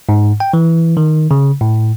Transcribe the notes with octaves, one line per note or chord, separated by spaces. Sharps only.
G#2
G5
E3
D#3
C#3
A2